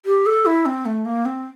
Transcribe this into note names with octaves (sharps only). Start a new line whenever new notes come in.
G4
A4
E4
C4
A3
A#3
C4